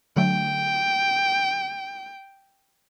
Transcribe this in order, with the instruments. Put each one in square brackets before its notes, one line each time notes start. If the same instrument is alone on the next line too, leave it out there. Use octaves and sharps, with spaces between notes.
[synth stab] D3 F#3 A3 [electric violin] G5